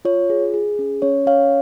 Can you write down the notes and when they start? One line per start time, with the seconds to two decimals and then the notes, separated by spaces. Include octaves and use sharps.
0.05 F4 C#5
0.30 G#4
0.54 G#4
0.79 C#4
1.02 C#4 C#5
1.26 C#4 C#5 F5